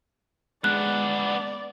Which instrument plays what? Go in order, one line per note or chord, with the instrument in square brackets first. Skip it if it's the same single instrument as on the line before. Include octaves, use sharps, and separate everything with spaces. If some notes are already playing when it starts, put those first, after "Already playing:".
[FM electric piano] G#3 [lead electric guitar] B3 D4 [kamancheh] D5 [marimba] F#6